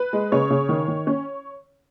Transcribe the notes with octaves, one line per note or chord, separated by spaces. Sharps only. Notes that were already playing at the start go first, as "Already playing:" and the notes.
Already playing: B4
G#3
C#3 C#5
C#3
D#3
D#3
C#4